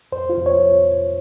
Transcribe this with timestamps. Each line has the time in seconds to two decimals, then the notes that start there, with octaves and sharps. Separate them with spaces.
0.12 F2 C5
0.30 F4
0.38 F2
0.46 C#5